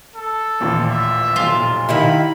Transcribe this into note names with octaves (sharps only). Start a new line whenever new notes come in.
A4
A1 D#2 A#2
E5
F1 B1 A#2 F4
D#3 D#4 E4 G4 E5 F5 B5